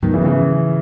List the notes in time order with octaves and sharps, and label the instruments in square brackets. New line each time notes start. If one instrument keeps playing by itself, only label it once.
[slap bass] G#2 F#3 B3 [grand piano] D#3
[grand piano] C#3 E3
C#3 E3